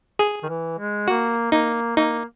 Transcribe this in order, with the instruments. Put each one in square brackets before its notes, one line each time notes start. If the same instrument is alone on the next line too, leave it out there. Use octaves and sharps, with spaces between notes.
[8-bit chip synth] G#4
[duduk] D#3
E3
G#3
[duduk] A#3 [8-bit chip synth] F#4
[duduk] A#3 [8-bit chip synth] D#4
[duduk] A#3 [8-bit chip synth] D#4